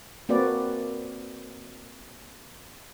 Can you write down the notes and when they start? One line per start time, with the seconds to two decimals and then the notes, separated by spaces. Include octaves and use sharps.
0.29 A#3 C4 F#4 B4 D5